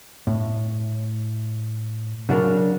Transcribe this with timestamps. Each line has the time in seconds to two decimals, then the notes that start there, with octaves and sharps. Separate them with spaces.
0.27 A2
2.29 C#3 F#3 D4 A#4